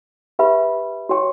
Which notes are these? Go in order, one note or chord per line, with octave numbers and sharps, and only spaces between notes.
G4 B4 E5 G5 B5
F#4 C#5 G5 C#6